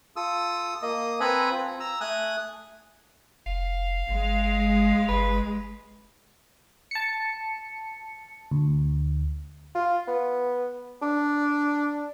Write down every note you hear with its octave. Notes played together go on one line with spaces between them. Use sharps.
F4 A4 D#6 E6
A#3 D#5 D#6
C4 A4 B4 G#5 A#5 B5
C4 F4
A#5 E6
A3 G#5 D#6 F#6
F1 F5
G1 G#3
F5
G1 B4
A5 C#7
D2
F4
B3
D4